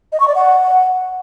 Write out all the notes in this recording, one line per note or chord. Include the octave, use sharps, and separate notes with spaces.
D#5
C#6
D5
F#5